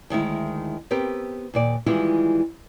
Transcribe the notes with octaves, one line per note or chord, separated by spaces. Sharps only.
D2 D#3 G#3 E4
B3 C4 G4 A#4
D#2 A#2 D5
D#3 E3 G3 G#3 E4 F4